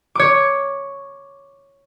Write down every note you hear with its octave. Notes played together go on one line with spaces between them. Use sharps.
C#5 D6